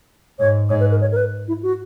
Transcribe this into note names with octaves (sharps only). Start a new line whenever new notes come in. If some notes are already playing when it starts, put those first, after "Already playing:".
G#2 C#5
G#2 C#5
B4
A#4
C#5
A#4
B4
E4
F#4